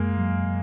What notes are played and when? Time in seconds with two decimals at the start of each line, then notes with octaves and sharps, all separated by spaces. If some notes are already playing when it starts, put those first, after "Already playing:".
Already playing: F#2 G#3 A#3
0.18 F#3